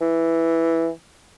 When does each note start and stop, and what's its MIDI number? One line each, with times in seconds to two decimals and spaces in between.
0.01 0.89 52